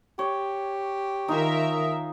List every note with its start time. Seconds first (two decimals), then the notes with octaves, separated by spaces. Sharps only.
0.19 G4 C#5
1.28 D#3 D#4 F4 G#4 A#4 E5